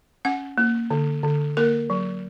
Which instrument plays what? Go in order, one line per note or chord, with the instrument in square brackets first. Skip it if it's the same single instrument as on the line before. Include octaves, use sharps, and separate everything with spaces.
[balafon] C#4 F#5
A#3
D3
D3
A#3 A#4
F#3